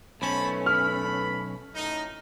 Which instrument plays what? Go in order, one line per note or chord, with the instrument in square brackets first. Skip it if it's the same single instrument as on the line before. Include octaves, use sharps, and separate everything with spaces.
[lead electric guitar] B1 C#4 [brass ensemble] A3 B4 [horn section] C5 A5 B5
[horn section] B5 [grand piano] F6
[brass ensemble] F#2 A2 [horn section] D#4